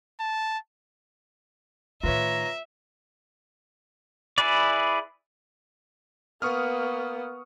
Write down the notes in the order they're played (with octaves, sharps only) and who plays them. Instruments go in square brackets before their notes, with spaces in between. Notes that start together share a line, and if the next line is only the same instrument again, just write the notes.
[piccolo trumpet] A5
[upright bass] A2 D#3 [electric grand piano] F4 B4 C#5 [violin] E5 [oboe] A#5
[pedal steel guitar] E4 G#4 B4 D5
[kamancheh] A#3 [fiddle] B3 [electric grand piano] C#6 D#6 F6